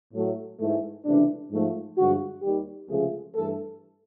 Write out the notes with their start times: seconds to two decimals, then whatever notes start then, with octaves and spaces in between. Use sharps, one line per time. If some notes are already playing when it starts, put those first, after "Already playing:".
0.14 A2 F#3 A3
0.59 G#2 E3 A3
1.05 C#2 C3 E3 A3 D4
1.52 G#2 F3 A3
1.98 G2 D3 F3 G#3 F#4
2.43 D#2 D#3 G3 G4
2.89 C#2 C3 F3 A3 G#4
3.35 G2 E3 A3 A4